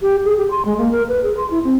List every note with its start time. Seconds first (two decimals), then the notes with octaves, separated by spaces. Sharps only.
0.02 G4
0.25 G#4
0.37 G4
0.50 C6
0.65 G#3
0.78 A#3
0.91 A#4
1.08 B4
1.23 G#4
1.37 C6
1.50 E4
1.64 C4